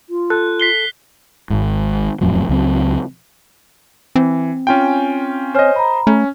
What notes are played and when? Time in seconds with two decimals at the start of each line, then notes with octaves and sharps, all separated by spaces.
0.10 F4
0.30 A4 F#6
0.60 B6 C7 G7
1.50 G#1 G#2
2.21 D#1 F2 A2 F#3
2.49 C#2 F#3 C4
4.16 E3 C4
4.67 C#4 F4 G5 G#5
5.55 C5 C#5 D#5 G#5 F6
5.76 A#5 B5
6.07 A3 C#4